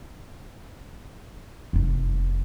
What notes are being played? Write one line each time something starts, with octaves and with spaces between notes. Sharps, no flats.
F1 D#4